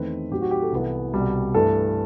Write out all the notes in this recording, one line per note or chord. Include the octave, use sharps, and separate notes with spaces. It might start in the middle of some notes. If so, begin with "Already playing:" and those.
Already playing: E2 D#3 A3 C4 D#4 B4
A2 F#3 C4 D#4 G4
F#4
G4
A4
C2 C3 E3 B3
C2 B2 G3
G2 E3 A3 A4